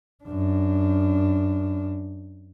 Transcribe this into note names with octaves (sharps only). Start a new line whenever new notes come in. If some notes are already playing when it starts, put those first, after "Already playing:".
F#2 D4